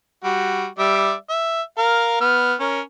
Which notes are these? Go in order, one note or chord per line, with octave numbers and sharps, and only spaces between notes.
G3 F#4
G3 D5 E5
E5
A#4 F5
B3 F6
C#4 A#4